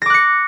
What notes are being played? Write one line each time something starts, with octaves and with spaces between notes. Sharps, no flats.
D6 F#6 A#6 C#7